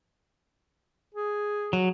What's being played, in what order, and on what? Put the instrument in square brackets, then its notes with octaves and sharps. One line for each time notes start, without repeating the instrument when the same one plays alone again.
[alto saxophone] G#4
[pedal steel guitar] F#3